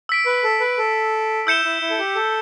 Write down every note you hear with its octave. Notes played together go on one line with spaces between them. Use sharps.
E6 B6 D7
B4
A4
B4
A4
E4 E6 G6 C#7 E7 G7
E4
E4
A4
G4
A4